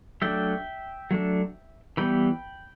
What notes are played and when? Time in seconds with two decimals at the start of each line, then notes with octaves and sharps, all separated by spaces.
0.22 F#3 A3 D4 E5 G5
1.11 F#3 A3 D4
1.97 E3 G3 B3 G5 B5